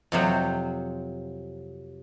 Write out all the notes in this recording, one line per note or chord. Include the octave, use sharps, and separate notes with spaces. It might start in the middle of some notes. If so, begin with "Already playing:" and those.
F2 C3 F#3